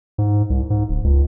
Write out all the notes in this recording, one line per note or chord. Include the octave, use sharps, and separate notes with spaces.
G#2
C2
G#2
D1
C#2